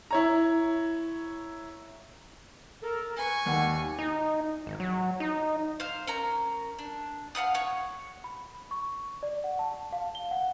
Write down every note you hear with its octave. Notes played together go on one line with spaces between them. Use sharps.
E4 C#5 A#5
A4 A#4
B4 G#5 C#6
D#2 G3 G#3 F#5
D#4
G#1
F#3
D#4
C5 F5
C#4 A#4 A#5
D4
F5 F#5 B5 D#6
C#5 F#5 C#6
B5
C#6
D5
F#5
A5
F5
G7
F#5